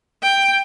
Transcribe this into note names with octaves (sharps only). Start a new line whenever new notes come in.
G5